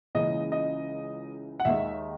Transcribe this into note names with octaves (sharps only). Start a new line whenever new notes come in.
C#2 C#3 E3 A#3 D#5
D#5
F#5
D#2 D#3 G#3 E5